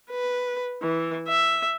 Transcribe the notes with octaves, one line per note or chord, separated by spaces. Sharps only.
B4
E3
E5